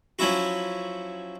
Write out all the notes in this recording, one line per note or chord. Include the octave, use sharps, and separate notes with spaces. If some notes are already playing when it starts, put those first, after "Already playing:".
F3 F#3 C#4 E4 F#4